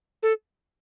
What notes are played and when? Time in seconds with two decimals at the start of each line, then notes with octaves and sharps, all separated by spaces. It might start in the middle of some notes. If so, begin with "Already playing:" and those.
0.23 A4